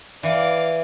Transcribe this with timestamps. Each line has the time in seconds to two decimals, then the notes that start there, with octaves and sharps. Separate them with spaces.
0.23 E3 D5 F5